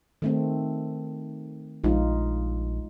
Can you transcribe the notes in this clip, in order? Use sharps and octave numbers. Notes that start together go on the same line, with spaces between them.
D#3 A3 C4
A#1 G#3 D#4 F4